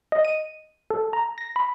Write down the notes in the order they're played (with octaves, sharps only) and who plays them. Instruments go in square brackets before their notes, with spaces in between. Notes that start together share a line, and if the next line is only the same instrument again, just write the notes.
[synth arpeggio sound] D#5
D#7
A4
A#5
A#6
B5